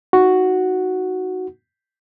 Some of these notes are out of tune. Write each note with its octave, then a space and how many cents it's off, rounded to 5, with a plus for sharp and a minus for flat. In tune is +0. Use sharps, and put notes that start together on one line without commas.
D#4 +15 F#4 +0 F#5 +0